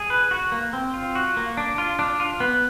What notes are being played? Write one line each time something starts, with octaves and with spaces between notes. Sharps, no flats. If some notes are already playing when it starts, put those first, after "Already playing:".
Already playing: G#4
B4
F#4
A#3
C4
F4
F#4
A#3
D4
F4
D4
F4
B3